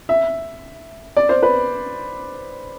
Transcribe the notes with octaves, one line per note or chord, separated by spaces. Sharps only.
E5
D5
C5
B4